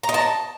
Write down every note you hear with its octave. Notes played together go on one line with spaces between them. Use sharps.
A#5
D#5
A5